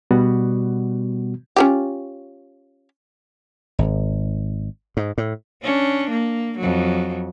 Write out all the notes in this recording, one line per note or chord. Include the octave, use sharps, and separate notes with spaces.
B2 G3 B3 F#4
C#4 F4 G4
G#1
G#2
A2
C#4 D4
A#3
F2 F#3